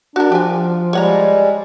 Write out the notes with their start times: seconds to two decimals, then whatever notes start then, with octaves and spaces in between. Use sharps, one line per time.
0.16 D4 F#4 A#4
0.32 F3 G4 G#5
0.93 G3 G#3 C#5 F#5 A#5